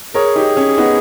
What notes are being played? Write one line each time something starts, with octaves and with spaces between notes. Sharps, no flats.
G#4 A#4 C#5
D#4 G4
C#4
B3 D#4